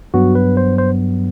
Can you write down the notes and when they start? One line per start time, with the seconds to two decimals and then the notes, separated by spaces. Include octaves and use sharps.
0.14 G2 F#3 B3 F#4
0.35 B4
0.57 C5
0.78 C5